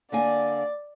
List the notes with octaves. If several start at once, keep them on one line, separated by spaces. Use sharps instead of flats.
D3 A#3 D5 G#5